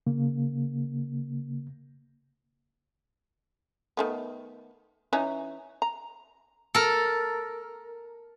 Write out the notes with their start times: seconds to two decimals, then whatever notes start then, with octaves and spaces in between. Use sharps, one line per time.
0.07 C#3 A#3
3.97 D#3 A3 B3
5.13 E3 C#4 D#4
5.82 A#5
6.74 A4 A#4